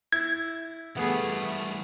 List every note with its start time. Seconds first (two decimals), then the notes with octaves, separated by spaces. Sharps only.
0.12 E4 G#6
0.97 E3 G3 A3 B3 G#4 B4